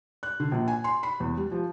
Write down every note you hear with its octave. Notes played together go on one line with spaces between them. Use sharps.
F#6
D3
A#1
G#5
C6
B5
E2
G3
F3